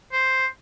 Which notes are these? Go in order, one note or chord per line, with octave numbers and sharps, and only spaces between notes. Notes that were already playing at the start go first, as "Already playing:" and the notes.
C5